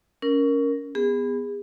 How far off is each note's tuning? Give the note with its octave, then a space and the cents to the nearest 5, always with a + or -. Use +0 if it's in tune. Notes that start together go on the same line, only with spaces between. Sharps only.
C#4 +15 A#4 +0
B3 +10 G#4 -35